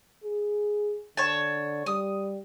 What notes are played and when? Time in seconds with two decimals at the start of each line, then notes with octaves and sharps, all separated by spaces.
0.24 G#4
1.17 D3 C#5 A5
1.86 G3 D#6